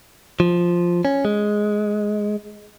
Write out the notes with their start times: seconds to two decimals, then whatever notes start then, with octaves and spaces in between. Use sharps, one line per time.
0.40 F3
1.05 C#4
1.25 G#3